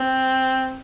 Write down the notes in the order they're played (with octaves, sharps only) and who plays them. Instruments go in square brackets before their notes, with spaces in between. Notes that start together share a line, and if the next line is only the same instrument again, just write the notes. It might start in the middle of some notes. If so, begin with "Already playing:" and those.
Already playing: [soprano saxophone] C4